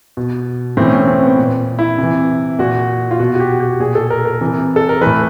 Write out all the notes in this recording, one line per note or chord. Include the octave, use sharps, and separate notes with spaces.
B2
A2 E3 C4
C#4
C4
C4
B3
A#2
E4
C3 E3
A#2 F#4
F4
B2 F#4
F#4
G4
G4
A#2 G#4
A4
A#4
A#4
C3 E3
A4
A#4
A2 E3 B4